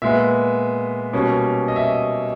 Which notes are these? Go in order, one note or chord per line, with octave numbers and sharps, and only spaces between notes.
A#2 G#3 B3 E5
B2 G3 A#3 C#4
D#5
E5
D#5